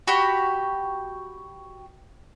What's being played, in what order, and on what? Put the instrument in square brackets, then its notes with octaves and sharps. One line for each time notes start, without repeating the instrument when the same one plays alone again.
[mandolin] F#4 G4 B5